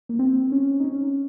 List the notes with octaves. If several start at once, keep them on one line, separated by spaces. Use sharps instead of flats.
A#3
C4
C#4
D#4
C#4